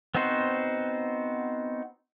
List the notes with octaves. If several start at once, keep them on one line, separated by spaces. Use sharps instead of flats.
B3 C4 D#4 F#4 C5